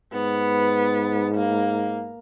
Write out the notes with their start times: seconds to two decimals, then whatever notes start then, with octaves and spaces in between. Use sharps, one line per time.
0.13 G#2 B3
1.35 A#3